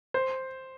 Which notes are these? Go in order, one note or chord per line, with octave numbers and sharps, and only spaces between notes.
C5